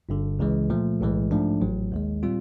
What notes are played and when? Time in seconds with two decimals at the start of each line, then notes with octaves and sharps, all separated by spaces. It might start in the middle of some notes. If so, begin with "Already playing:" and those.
0.09 G1 G2 D3
0.39 C#2 C#3 E3 G#3
0.70 A#2 F3 A3
1.01 B1 A2 E3 G#3
1.31 G#2 F3 A3 D4
1.61 A1 A2 F#3
1.92 D#2 D#3 G#3
2.23 A#2 G3 C4 F4